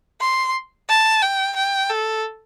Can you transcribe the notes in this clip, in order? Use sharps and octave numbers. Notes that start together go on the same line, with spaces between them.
C6
A5
G5
G5
A4